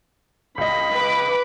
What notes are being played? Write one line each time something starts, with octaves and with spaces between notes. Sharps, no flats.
C#2 D#5 B5
B4 D6